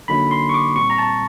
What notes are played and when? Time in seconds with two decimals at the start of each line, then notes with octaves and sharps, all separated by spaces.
0.08 D3 F#3 A#3 D#4 B5
0.31 C6
0.49 C#6
0.54 D6
0.76 A#2 G3 C4 C#6
0.90 A#5
0.98 A5